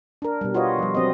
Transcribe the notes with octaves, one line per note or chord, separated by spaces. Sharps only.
D4 A#4
B2 G3
F4 F#4 B4 C#5 D#5
F3 G3
F#3 C4 D#5